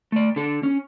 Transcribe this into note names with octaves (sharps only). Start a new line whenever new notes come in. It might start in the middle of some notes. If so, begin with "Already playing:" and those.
A3 D5
D3 A4
C#4